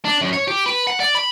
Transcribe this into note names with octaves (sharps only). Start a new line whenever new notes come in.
D4
F#2
C#5
G4
B4
F#5
D5
B5